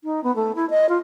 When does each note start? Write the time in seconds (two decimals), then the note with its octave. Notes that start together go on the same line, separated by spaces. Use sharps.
0.04 D#4
0.24 B3
0.36 A3
0.55 E4
0.70 D#5
0.89 F4